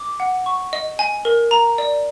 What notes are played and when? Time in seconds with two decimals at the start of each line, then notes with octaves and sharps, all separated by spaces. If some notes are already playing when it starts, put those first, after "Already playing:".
Already playing: D6
0.20 F#5
0.46 C#6
0.73 D#5
0.99 G#5
1.25 A#4
1.51 A#5
1.78 D5